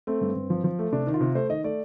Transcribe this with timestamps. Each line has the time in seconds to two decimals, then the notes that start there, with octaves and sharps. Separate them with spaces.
0.07 A3 C4
0.21 G2
0.36 G2
0.50 F3
0.64 F3
0.79 A3
0.92 C3 D4
1.07 D#3
1.14 F4
1.21 C3
1.35 A3 C5
1.49 D#3 D#5
1.64 A3 D5